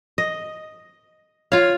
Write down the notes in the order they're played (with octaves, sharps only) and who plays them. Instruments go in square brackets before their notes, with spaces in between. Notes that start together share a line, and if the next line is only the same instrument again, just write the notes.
[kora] D#5
[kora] F4 F5 [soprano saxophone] C#5